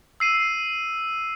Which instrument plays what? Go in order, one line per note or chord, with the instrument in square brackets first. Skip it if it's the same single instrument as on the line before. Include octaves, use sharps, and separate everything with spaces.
[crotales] E6 C7 D#7